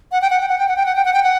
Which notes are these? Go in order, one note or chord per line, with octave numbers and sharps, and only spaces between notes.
F#5
G5
F#5
G5
F#5
G5
F#5
G5
F#5
G5
F#5
G5
F#5